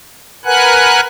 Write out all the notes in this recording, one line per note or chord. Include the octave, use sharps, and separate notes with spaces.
A#4 B4 F#5 G#5 F#6